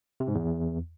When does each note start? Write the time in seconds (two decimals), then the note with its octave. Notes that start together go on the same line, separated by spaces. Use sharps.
0.20 C3
0.28 G#2
0.35 E2